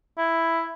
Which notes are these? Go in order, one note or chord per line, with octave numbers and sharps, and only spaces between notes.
E4